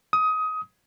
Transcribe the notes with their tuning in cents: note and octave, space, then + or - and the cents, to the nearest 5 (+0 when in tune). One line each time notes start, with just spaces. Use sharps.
D#6 +20